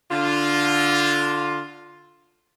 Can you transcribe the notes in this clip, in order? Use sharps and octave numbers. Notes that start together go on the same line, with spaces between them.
D3 F4